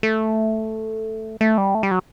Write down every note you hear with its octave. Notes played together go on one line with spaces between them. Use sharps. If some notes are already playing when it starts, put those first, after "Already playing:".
A3
A3
G3
A3
G3
F#3